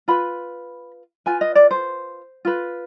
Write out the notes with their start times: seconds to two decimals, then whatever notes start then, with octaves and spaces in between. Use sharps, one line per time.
0.08 F4 B4 B5
1.26 F4 B4 G#5
1.41 D#5
1.55 D5
1.71 C5
2.45 F4 B4